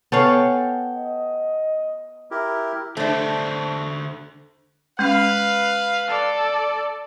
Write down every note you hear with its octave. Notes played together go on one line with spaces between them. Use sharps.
B3 A4 C#5 F5 G5 G#5
D#5
E4 G4 A#4
D3 A3 D4 C5 E5
G#3 C#4 B4 F5
A4 D5